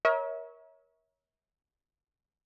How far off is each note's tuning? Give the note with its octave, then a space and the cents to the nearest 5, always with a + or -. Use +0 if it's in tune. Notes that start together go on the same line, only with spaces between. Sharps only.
A#4 +30 C#5 +0 E5 -35